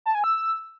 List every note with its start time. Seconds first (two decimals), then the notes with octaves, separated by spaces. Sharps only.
0.06 A5
0.15 G#5
0.24 E6